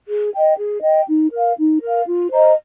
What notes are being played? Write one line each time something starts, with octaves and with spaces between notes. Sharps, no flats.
G#4
D#5 G5
G#4
D#5 G5
D#4
A#4 F5
D#4
A#4 F5
F4
C5 D#5 A#5